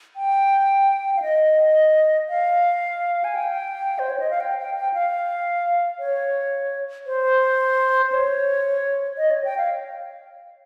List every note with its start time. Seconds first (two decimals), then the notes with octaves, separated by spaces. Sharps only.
0.16 G5
1.16 F5
1.22 D#5
2.29 F5
3.24 G#5
3.35 G5
3.99 C5
4.10 C#5
4.20 D#5
4.30 F5
4.40 G5
4.59 G5
4.76 G5
4.94 F5
5.99 C#5
7.07 C5
8.12 C#5
9.18 D#5
9.31 C#5
9.45 G5
9.58 F5